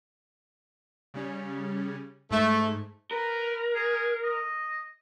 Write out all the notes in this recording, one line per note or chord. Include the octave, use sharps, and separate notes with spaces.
C#3 G3 C#4
G#2 A3
A#4 B4
G#4
D#5